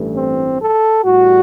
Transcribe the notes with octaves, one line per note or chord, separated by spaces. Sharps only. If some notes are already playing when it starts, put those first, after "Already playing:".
Already playing: A1 G2 E3 A3
C4
A4
A1 A2 G3 F#4